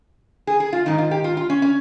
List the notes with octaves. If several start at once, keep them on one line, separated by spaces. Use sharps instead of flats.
G#4
G#4
F4
G#2 D#3 D#4
F4
G4
F4
F4
C#4
C#4